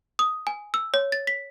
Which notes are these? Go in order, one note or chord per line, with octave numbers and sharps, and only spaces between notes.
D#6
G#5
E6
C#5
A6
B6